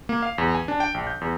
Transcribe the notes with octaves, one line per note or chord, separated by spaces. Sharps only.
A#3
F5
E2
G#5
D4
G5
A#1
G6
E2